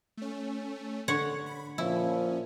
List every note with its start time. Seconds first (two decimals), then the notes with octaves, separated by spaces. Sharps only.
0.17 A3 C#4
1.08 D3 C#5 F#5
1.46 B5
1.78 A#2 F3 C#4 E4